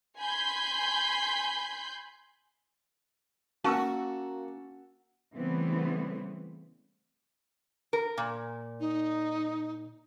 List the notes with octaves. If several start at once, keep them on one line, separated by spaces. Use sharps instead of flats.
G#5 B5 C6 G6
A#3 C#4 F#4 A5 C#6 E6
C#3 E3 G3 A3 B3 C4
A#4
A#2
D#4